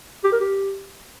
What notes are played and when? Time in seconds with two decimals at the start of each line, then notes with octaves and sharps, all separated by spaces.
0.24 G4
0.32 A#4
0.40 G4